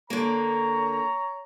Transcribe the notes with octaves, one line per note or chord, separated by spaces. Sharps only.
D3 A#3 C#5 A#5